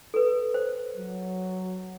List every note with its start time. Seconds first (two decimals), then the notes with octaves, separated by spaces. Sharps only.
0.14 A4 B4
0.54 C5
0.97 F#3